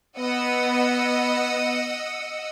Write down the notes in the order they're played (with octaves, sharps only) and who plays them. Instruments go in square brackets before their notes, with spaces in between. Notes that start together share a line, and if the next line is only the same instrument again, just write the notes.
[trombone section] B3 [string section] D#5 F#5 E6